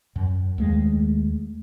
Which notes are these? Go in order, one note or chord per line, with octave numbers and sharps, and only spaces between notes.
F#2
D#2 G#3 A3